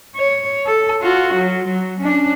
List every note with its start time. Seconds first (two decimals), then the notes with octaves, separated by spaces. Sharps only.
0.16 C#5
0.66 A4
1.02 F4 F#4
1.35 F#3
1.68 F#3
2.01 C#4 D4